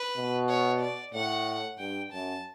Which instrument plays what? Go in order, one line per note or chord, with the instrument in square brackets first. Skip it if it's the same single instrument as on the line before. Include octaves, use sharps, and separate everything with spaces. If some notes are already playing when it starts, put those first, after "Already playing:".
Already playing: [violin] B4
[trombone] B2
[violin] C#5
D5
[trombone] A2 [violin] F#5
[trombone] G2 [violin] G5
[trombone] F#2 [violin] A5